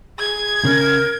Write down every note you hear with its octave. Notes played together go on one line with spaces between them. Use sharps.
G#4 G#6
C#3 A#4